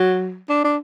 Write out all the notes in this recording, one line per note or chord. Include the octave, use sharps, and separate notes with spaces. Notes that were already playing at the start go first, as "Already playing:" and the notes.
Already playing: F#3
D4
D4